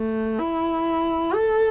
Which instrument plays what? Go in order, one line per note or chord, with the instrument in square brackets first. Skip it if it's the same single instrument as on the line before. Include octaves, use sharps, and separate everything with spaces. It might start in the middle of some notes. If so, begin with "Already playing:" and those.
Already playing: [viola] A3
E4
A4